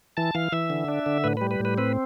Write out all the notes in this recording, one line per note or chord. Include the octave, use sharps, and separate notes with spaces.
E3 A5
E3 F5
E3 E5
D3
D4
D3
A2 B4
G3 B4
B4
A2
B4
C4 B4